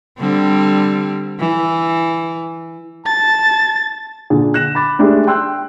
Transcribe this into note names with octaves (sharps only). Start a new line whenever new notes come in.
D3 G3 C4
E3
A5 A6
A#2 D3 G#4
F#6 A#6 E7
B5 D6 A6
G#3 A3 D4 G4
G5 C6 E6 F#6